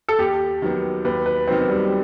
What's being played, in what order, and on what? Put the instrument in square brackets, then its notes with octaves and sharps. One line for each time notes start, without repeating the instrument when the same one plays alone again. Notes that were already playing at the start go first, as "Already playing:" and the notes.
[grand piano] A4
[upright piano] D#2 [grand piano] G4
[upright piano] D#3 F#3 B3
[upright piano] D#2 [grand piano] B4
[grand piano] B4
[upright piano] D#3 F#3 B3 [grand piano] C4
[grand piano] G3